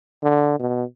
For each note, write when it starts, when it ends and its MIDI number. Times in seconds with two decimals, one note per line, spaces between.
0.23 0.57 50
0.59 0.83 47